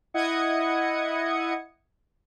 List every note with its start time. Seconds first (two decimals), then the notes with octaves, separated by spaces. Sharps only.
0.14 E4 D#5 F#5 D#6 G#6 C#7